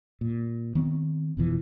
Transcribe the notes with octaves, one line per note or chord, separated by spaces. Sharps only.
A#2
D#3 B3 C4
F1 B2 E3 F3